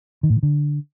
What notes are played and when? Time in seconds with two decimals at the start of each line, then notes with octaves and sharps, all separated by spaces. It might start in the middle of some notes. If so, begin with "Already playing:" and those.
0.23 D#3
0.30 A2
0.36 D#3
0.43 D3